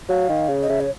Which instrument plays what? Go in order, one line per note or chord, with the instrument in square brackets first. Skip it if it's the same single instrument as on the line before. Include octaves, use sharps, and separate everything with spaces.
[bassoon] F#3 [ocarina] F5
[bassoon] D#3
C#3
[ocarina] D#5
[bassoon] C#3 [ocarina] E5
[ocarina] C#5